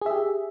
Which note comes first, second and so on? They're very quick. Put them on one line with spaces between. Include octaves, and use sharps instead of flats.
G#4 E5 G4